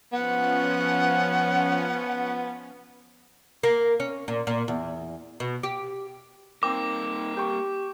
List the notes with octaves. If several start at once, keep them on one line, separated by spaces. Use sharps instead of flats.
F3 B3 C#4 F#5
A#3
C#4
A#2
A#2
E2
B2
G4
G3 A#3 C4 D#4 A#4 D6
G4 G5 C#6